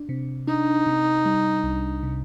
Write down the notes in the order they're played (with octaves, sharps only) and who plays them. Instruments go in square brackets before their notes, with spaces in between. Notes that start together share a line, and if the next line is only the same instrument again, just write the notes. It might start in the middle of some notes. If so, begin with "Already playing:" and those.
Already playing: [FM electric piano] D4
C3
[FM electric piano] D4 [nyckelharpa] D#4
[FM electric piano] C3
G3
C2
C3